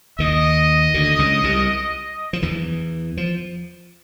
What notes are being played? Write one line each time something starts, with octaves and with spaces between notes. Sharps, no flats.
D#2 D#3 D#5
D2 D3
C#2 C#3
C2 C3
F3
E2 E3
F3